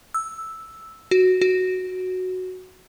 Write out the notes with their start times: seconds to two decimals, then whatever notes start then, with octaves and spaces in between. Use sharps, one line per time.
0.14 E6
1.11 F#4
1.41 F#4